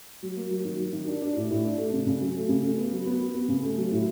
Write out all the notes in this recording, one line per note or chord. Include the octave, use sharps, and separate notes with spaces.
F#3
A#3
F#3
D#3
F#3
D#3
D4
D4
A2
A2
D4
A3
C#3
C#3
F#3
A3
C#3
A3
B3
F#3
B3
B3
B3
C#3
A3
F#3
A2